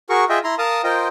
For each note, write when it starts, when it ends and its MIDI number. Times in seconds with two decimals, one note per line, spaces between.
0.09 0.24 66
0.09 0.24 68
0.09 0.24 70
0.09 0.24 85
0.29 0.39 65
0.29 0.39 68
0.29 0.39 75
0.29 0.39 76
0.29 0.39 79
0.44 0.55 64
0.44 0.55 82
0.44 0.55 84
0.58 0.82 70
0.58 0.82 77
0.58 0.82 81
0.58 0.82 87
0.84 1.08 65
0.84 1.08 70
0.84 1.08 72
0.84 1.08 75
0.84 1.08 79